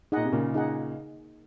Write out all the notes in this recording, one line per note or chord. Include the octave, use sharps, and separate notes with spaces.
A#2 D#4 G#4 D#5 F#5
C3
A#2 C#3 A#3
D#4 G#4 D#5 F#5